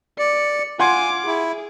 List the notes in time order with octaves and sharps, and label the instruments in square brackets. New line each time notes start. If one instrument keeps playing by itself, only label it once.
[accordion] D5 [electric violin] C#7
[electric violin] F4 D6 [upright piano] F#5 C6 G#6 [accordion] G#5
[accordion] E4 [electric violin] G#4